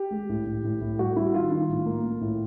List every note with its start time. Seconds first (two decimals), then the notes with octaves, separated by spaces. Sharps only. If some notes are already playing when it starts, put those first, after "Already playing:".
Already playing: G4
0.11 G#3
0.29 A2
0.46 A2
0.64 A2
0.81 A2
0.99 G3 F#4
1.16 G3 E4
1.34 D#3 F4
1.51 D#3
1.69 A2
1.86 A#3
2.04 A#3
2.21 A2